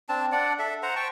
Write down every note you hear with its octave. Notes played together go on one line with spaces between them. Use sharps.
C4 D4 A5
D4 D5 F#5
A4 E5
C5 F#5 A#5
G5 A5 C#6